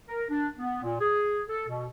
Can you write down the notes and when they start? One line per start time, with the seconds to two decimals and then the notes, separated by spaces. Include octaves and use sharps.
0.08 A#4
0.29 D4
0.58 B3
0.83 A#2
1.00 G#4
1.49 A4
1.68 B2